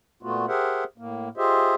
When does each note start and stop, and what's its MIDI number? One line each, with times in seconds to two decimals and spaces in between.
0.23 0.46 46
0.23 0.46 57
0.23 0.46 59
0.23 0.46 65
0.23 0.46 66
0.48 0.84 67
0.48 0.84 68
0.48 0.84 70
0.48 0.84 72
0.48 0.84 76
0.48 0.84 78
0.98 1.29 45
0.98 1.29 58
1.37 1.75 65
1.37 1.75 67
1.37 1.75 68
1.37 1.75 72
1.37 1.75 75
1.37 1.75 76